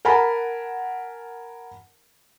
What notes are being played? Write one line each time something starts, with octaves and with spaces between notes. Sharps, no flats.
A#4 F#5 G#5 A5 B5